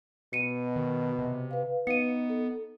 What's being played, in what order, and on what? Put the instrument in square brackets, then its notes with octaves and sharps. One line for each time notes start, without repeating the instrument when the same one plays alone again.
[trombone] B2 [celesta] C#7 D#7
[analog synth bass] D#3
C3
[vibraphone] B4 F5
[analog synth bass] B3 [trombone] D#4 [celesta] C#7 D#7
[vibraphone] A4